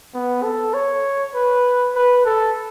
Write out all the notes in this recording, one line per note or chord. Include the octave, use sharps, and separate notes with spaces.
B3
A4
C#5
B4
B4
A4